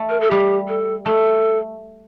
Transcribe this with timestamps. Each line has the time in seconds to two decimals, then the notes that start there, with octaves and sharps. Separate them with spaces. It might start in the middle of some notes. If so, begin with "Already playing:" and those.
Already playing: A3
0.10 A#4
0.21 A4
0.31 G3 G4
0.68 A4
1.06 A3 A4